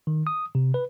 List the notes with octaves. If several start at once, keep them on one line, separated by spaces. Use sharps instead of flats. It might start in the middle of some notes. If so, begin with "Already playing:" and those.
D#3
D#6
C3
B4